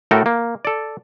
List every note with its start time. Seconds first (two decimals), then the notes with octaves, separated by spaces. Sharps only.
0.11 A2 A3 F#4 A4 A#4 G5
0.26 A#3
0.65 A4 D5